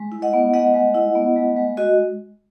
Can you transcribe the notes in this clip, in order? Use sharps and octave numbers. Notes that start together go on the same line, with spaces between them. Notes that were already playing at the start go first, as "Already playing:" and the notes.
Already playing: G#3
E4
D#5 F#5
B3
G#3 D#5 F#5
G#3
E4
B3
G#3
G#3
F#4 D#5